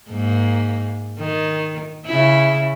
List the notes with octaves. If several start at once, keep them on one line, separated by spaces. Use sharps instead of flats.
G#2 A#3
D#3
C#3 E4